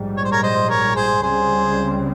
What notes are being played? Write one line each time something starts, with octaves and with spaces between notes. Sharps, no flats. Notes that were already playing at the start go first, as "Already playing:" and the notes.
Already playing: A#1 G#2 G3
C#5
C5
A#4 C#5
C5 D#5
A#4 C#5
G#4 C5
C#2 C#3 G3 C4 G#4 C5